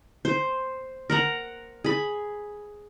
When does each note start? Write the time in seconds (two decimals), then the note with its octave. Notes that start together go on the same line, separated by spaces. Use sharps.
0.25 C5
1.10 A#4 F#5 A#5
1.84 G#4 B5